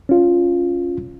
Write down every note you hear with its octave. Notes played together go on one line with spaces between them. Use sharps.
C#4 F4